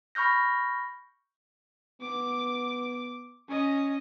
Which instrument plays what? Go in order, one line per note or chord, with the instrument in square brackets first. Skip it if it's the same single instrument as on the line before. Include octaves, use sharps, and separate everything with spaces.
[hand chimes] B5 C#6 F6 G6 A#6
[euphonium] B3 [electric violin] D6
[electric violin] C#4 D#5